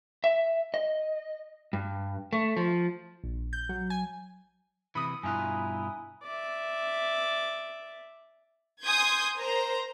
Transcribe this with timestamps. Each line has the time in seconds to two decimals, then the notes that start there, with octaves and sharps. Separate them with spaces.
0.24 E5
0.74 D#5
1.73 G2
2.33 A3
2.57 F3
3.24 A#1
3.53 G6
3.69 F#3
3.90 G#5
4.95 C3 E3 B5 D#6 C#7
5.23 G2 B2 E4 F4 G#5 A#5 F#6
6.24 D5 E5
8.84 G#5 C6 D#6 G6 G#6
9.36 A#4 C5 A#5